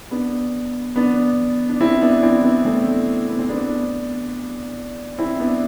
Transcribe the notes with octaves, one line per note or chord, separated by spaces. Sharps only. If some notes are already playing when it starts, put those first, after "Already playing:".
B3 D4
B3 D4
D4
C4 E4
B3 D4
C4 E4
B3 D4
A3 C4
B3
C4
B3 D4
C4 E4
B3 D4